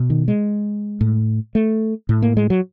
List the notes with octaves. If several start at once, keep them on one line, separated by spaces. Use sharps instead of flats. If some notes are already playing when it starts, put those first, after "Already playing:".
Already playing: B2
D#3
G#3
A2
A3
A2
A#3
G#3
F#3